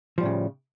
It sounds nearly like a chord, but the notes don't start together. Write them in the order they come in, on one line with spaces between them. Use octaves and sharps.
F3 G3 A2 C#3